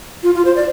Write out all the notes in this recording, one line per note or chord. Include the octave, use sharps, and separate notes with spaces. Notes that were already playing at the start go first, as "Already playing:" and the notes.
F4
F4
C5
D5